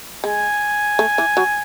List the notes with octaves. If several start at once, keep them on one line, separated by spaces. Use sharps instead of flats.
G#3 G#5
A3
E3
F#3